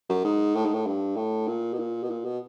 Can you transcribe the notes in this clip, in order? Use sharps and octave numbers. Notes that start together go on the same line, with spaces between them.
F#2
G#2
A2
G#2
A2
G2
A2
A#2
B2
A#2
B2
A#2
B2